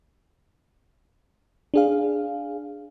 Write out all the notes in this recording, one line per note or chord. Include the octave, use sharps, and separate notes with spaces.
D4 G#4 F5